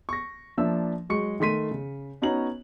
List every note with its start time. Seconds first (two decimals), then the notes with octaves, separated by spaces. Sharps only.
0.09 C#6 A#6
0.58 F3 A#3 D4 E5 E6
1.09 F#3 G#3 C#6 C#7
1.40 D#3 A3 C6 B6 D#7
1.71 C#3
2.22 B3 C#4 D#4 F#4 A#5 F#7